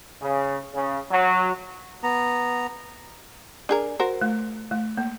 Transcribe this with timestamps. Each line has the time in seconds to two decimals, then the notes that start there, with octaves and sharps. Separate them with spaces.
0.21 C#3
0.74 C#3
1.11 F#3
2.03 B3 A#5
3.69 D4 G#4 A#4
3.99 F#4 A#4 C5
4.22 A3
4.71 A3
4.97 A#3